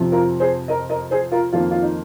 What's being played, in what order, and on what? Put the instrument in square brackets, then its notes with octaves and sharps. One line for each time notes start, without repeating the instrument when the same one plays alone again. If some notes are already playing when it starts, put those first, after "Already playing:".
Already playing: [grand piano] F2 C3 F3
F4 A#4
G#4 C5
A#4 D#5
A#4 D#5
G#4 C5
F4 A#4
F2 D#3 A#3 F4
F4
D#4